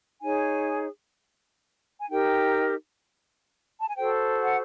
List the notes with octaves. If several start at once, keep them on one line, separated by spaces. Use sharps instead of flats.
D#4 G#4 C#5 G#5
G#5
D#4 G4 A#4 G5
A5
G#5
F#4 A4 C5 G5
F#5